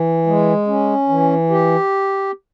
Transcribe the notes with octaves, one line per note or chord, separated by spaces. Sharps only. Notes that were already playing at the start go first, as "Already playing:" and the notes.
Already playing: E3
G#3
C#4
E3
G4